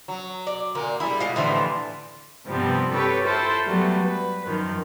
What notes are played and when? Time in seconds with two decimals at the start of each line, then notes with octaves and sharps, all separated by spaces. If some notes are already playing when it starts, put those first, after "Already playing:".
0.08 F#3
0.47 D5
0.75 A#2 D3 A#3
1.00 G3 E4 G#4
1.20 B2 G#3 F4
1.36 A2 D3 E3 F3 E5 G#5
2.47 G2 C3 F3 G3 B3 C4
2.92 G4 A4 B4 C#5 G5
3.25 E4 F4 A4 C5
3.66 F#3 G3 A3 B3
4.04 B4
4.46 F#2 D#3 F3